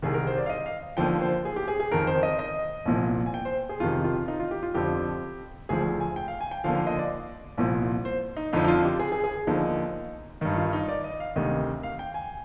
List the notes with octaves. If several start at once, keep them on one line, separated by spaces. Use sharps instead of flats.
C2 C3 D#3 G#4
A#4
C5
D5
F5
D#5
F5
D#2 D3 F3 G5
C5
G#4
G4
G#4
G#4
F2 D#3 A#4
C5
D#5
D#5
C2 A#2 F3
G#5
G5
C5
G#4
F2 C3 D#3 F4
F4
D#4
F4
G4
F4
F2 D3 F3 G4
D2 D3 F3 G#4
G#5
G5
F5
G#5
G5
D#2 D3 F3 F5
F5
D#5
D5
C2 A#2 F3
C5
D#4
F2 D3 F3 D#4
D#4
F4
G4
G#4
G#4
G#4
D#2 D3 F3 D#4
G2 D#3 D#4
F4
D#4
D5
D#5
F5
D2 C3 D#3 D#5
F5
G5
G#5